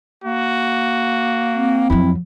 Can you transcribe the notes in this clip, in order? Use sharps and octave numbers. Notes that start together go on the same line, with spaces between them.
A#3 F#4
C4
F2 F#3 E4